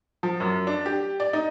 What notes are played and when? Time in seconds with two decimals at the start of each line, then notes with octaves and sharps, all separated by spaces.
0.23 F3
0.40 F#2
0.67 D4
0.86 G4
1.20 D5
1.33 D#4